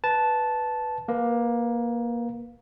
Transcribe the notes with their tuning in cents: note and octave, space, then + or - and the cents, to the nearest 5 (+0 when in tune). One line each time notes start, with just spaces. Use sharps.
B4 +0 A5 -10
A#3 +15 B4 +0